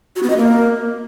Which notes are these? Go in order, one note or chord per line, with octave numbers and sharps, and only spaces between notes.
F#4
B3
D#5
A#3